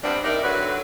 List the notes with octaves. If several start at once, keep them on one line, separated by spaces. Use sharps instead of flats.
G2 C3 B3 C4 D4
D#4 E4 G4 A#4 D5
D3 F#3 F#4 B4